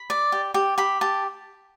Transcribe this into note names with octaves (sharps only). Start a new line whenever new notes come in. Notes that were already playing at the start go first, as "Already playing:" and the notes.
Already playing: B5
D5
G4
G4
G4 B5
G4 A5